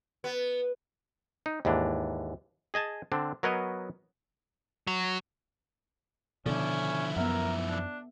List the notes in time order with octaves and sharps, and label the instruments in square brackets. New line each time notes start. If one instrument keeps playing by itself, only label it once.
[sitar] B3
[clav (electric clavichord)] D#4
D#2 G#2 E3 D4
G#4 D#5 G#5 A5
D3 C4 D4
F#3 B3 A#4 B4 C#5 D#5
[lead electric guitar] F#3
[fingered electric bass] B2 D3 [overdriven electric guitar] F3 E4 [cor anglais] C#4 [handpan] A4 D5
[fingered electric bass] F#2 [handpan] B3 E5 F#5 [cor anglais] A#4
[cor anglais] D4